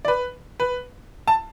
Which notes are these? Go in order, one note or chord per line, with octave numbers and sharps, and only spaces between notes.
D5
B4
B4
A5